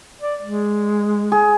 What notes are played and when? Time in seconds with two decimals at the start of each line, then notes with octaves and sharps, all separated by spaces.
0.22 D5
0.41 G#3
1.32 G#4